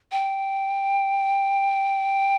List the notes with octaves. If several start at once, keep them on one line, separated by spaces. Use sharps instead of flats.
G5